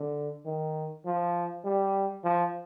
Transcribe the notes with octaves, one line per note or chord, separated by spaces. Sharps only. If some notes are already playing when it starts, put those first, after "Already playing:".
Already playing: D3
D#3
F3
G3
F3